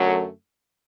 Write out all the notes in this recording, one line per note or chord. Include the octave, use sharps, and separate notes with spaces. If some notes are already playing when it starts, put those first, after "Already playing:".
Already playing: F#2 D3 F#3 A3